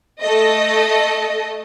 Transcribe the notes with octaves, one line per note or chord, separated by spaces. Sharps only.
A3 A4 D#5